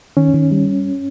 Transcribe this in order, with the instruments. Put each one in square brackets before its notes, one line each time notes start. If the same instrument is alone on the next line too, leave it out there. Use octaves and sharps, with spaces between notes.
[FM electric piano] D#3 [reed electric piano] C#4
[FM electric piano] D#3
G3